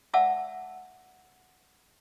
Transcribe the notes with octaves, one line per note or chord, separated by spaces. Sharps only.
D5 E5 F#5 A5 E6